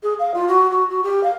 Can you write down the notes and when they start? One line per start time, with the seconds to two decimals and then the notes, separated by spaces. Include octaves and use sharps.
0.02 G#4
0.19 F5
0.34 F4
0.47 F#4
0.70 F#4
0.89 F#4
1.03 G4
1.23 F5